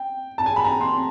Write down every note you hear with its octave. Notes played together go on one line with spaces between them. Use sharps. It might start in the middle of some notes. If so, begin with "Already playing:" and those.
Already playing: G5
A5
G#5
B5
A#5
C6